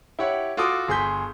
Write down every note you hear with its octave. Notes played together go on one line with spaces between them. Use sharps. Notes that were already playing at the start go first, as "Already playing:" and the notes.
E4 G4 C#5 F#5
F4 F#4 A4 D6 D#6
G1 G#4 C6 G6 B6